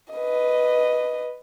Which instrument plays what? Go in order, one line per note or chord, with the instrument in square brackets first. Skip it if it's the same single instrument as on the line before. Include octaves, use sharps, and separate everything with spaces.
[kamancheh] B4 D#5